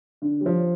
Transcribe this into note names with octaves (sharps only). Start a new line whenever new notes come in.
D3
G3
F3